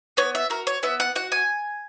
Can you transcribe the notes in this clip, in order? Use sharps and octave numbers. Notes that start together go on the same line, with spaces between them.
B3 C#5
E5
F#4 A#4
C#5
B3 E5
F#5
F#4 F#5
G#5